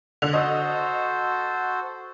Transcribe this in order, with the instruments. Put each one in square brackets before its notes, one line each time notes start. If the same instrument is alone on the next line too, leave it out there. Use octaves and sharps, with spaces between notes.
[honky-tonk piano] D3
[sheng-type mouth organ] F#4 A4 C5 [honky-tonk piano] D#5